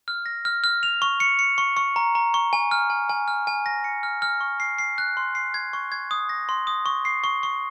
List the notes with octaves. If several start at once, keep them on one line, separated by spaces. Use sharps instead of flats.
F6
A#6
F6
F6
F7
C#6
C#7
C#7
C#6
C#6
A#5
A#5
C#6
G#5
F6
G#5
G#5
F6
G#5
A#6
C#7
F6
F6
C#6
C7
C7
F#6
C6
C7
G#6
C#6
G#6
D#6
A#6
C6
D#6
C#6
C7
C#6
C#6